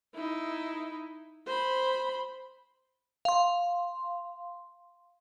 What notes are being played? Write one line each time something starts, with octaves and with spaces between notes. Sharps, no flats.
D#4 E4
C5 B5
F5 C6